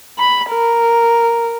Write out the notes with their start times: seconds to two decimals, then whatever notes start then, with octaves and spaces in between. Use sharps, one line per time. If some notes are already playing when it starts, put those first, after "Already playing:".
0.19 B5
0.50 A#4